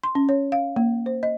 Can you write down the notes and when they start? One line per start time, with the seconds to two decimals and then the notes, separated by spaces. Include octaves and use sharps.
0.03 C6
0.15 C#4
0.29 C#5
0.52 F5
0.76 A#3
1.06 C5
1.23 D#5